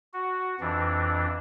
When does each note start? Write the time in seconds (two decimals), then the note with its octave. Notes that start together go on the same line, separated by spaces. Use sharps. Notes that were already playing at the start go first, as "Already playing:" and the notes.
0.13 F#4
0.61 F2 E3 D4